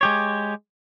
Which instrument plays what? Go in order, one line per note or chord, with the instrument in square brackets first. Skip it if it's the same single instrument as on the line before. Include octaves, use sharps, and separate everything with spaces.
[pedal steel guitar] G#3 G4 C#5